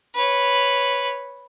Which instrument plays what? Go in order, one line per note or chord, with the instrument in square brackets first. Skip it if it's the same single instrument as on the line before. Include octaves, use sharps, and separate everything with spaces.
[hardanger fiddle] B4 C#5